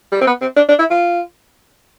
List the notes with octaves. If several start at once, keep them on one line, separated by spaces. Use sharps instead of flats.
G3
C4
B3
C4
D4
D4
E4
F4